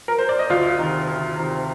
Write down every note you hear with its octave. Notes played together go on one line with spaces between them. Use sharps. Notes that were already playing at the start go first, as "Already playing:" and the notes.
A#4
C5
D5
D#5
D2 F4 F5
C3 D#3
D2
C3 D#3